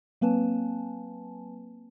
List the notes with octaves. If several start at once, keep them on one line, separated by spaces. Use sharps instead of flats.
F#3 A#3 C4 B4 G#5 A5